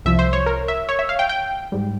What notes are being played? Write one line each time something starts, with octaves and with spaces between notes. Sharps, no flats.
C2 C3 F3 E5
C5
C#5
A#4
E5
C#5
E5
F5
G5
G5
G#2 G3